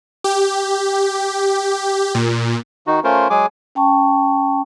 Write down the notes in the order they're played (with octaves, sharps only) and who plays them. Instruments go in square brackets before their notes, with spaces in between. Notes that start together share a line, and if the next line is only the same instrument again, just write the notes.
[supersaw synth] G4
A#2
[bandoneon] D#3 D#4 F#4
A3 C#4 F4 A#4 C5
F#3 G#3 G#4 G#5 D6
[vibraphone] C#4 G5 A5 C#6